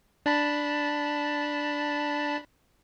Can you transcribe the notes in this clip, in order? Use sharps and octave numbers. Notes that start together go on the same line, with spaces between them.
D4 A5 B5